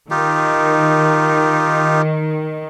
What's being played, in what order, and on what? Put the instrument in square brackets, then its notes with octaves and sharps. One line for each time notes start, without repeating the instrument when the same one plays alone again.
[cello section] D#3 [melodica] D#4 F4 G4